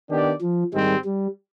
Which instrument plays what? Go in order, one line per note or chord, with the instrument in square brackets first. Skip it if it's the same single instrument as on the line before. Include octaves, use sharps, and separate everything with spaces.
[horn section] D#3 B3 D4 G4 D5
[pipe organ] F3
[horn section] G#2 D#3 G#3 C4 [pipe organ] G3
[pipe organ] G3